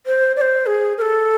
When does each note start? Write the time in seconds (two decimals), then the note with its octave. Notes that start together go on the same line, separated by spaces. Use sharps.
0.06 C5
0.36 D5
0.41 C5
0.66 G#4
0.98 A#4
1.02 A4